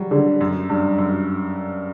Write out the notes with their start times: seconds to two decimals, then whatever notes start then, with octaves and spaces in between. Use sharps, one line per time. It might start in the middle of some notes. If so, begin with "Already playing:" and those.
Already playing: F#3 G3
0.11 D3
0.41 F#2
0.69 G2
0.98 F#2